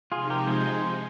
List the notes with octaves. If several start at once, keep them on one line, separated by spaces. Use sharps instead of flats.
C3 F3 G#3 D#4 F4 G#4
G4 A#4
G#4 C5